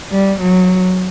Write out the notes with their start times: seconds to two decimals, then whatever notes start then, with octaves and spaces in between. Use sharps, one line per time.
0.11 G3
0.40 F#3